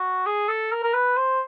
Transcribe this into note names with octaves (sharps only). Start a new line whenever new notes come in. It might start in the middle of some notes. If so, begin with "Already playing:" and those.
Already playing: F#4
G#4
A4
A#4
A#4
B4
C5